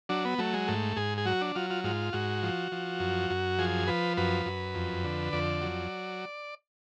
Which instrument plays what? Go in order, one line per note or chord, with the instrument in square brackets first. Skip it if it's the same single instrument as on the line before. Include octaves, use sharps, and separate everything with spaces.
[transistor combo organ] F#3 D4
B3
F#3 A3
G#3
G#2 A3
G#2 G#4
G#4
F#3 F#4
D4
F#3 F4
F4
G#2 F4
G#2 F#4
F3
F3
F#2
F#2
F3 G#4
F3 B4
F#2 B4
F#2
F2
D3
F2 D5
F#3